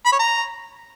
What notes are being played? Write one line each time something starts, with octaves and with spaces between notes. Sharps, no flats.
B5
C#5
A#5